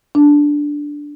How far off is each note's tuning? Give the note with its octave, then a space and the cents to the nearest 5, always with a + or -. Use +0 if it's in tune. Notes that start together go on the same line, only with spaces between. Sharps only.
D4 -5